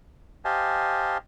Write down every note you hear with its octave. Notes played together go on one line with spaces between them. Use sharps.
G4 C5 D#5 F5 G#5 A5